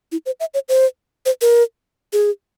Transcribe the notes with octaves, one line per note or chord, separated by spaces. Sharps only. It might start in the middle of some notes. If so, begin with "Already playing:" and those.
E4
C5
E5
C#5
C5
C5
A#4
G#4